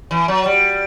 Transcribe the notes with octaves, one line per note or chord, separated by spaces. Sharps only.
E3
F#3
G3